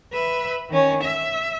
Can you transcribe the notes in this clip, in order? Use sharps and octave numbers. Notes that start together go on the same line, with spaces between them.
B4 E5
D#3 C#4
E5